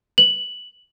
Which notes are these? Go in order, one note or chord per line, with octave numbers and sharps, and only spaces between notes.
F#7